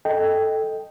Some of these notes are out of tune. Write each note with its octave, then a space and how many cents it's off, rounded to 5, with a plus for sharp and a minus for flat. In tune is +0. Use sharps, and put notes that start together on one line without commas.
A4 +0 D#5 +0 G5 +0